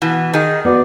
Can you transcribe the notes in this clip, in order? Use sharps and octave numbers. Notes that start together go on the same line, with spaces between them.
B2 E3
D#3 G#4 D#5
B3 F#4 D5